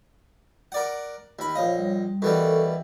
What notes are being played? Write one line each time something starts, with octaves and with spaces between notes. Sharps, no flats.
A#4 D5 F#5
D#2 B5
A#1 C5 C#5 D#5 F5
G3
B2 E3 G3 A4 A#4 C#6